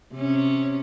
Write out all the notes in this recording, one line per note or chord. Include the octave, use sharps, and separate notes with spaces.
C3 C#4